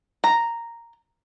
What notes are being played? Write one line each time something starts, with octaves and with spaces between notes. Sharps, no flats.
A#5